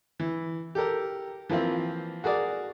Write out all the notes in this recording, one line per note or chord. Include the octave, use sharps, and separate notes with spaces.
E3
G4 A4 A#4
E3 F3 A#3 C4 F4
F#4 G#4 A#4 D5